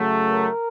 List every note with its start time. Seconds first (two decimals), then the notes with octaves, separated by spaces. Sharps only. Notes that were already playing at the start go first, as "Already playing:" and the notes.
Already playing: C#3 F#3 A3
0.29 A#4